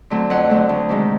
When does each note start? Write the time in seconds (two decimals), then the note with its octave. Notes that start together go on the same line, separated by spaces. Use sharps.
0.10 D3 F#3 A3 C4
0.30 F2 F#5
0.49 D3 F#3 A3 C4
0.69 D2
0.89 C3 D#3 G#3